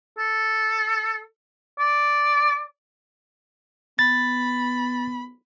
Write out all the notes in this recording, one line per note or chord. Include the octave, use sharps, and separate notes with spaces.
A4
D5
B3 B5 A6